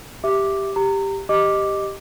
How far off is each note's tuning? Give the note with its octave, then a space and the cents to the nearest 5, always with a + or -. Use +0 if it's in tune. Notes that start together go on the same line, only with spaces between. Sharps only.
G4 +0 E5 +0 D6 +0
G4 +5 A#5 -25
G4 +0 D#5 -5 D6 +0